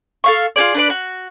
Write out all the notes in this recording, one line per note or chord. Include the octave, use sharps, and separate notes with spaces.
A4 F5 C#6
F4 F#4 G#4 D5
D4 B4 D5
F#4